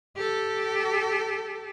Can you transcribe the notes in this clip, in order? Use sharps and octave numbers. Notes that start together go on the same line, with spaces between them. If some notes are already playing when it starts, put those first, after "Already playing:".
G4 A4